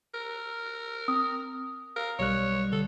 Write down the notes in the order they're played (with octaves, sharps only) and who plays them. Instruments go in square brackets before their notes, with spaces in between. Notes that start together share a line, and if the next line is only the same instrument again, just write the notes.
[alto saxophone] A#4
[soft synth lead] C4 [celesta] D#6
[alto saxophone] A#4 [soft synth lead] F5
[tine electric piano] B1 G3 F#6 [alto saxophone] C#5
[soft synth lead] D3 [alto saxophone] A4